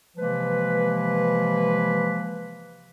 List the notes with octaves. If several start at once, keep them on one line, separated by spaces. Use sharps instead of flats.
C3 E3 F3 G#3 A#3 B4